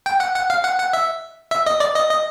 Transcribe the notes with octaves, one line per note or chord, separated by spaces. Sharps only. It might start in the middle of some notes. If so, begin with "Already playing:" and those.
G5
F#5
F#5
F5
F#5
F#5
E5
E5
D#5
D5
D#5
D#5